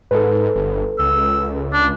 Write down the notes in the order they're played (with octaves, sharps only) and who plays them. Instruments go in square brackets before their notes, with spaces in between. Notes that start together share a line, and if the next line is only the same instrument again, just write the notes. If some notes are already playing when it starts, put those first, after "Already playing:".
[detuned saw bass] G#2 [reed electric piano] A4 B4
[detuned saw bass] G1
[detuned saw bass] C#2 [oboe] E6
[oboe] D4